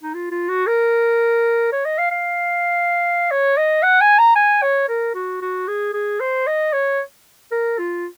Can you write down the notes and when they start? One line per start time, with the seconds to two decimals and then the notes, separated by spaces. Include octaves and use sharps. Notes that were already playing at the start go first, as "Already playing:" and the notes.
0.03 D#4
0.14 F4
0.31 F4
0.49 F#4
0.67 A#4
1.72 C#5
1.85 D#5
1.98 F5
2.11 F5
3.31 C#5
3.57 D#5
3.83 F#5
4.01 G#5
4.19 A#5
4.35 G#5
4.62 C#5
4.88 A#4
5.14 F#4
5.41 F#4
5.68 G#4
5.93 G#4
6.20 C5
6.47 D#5
6.73 C#5
7.51 A#4
7.79 F4